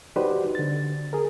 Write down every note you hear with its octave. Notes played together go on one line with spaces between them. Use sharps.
D#4 F#4 G4 B4 C5 D5
D3 A6
G#4 A#4